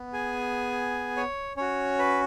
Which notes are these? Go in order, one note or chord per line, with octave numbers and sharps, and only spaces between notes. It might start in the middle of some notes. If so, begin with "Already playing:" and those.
Already playing: B3
G#4 G#5
C#5
C#4 F#4 C#5
B4